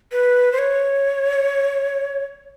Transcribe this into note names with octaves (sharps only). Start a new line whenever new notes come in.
B4
C5
C#5